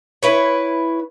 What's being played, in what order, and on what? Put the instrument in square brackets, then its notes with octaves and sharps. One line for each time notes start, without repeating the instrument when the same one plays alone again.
[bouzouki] E4 B4 C#5